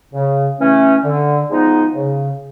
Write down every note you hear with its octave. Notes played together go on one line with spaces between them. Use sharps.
C#3
E3 A3 C#4
D3
F3 G#3 B3 D#4
C#3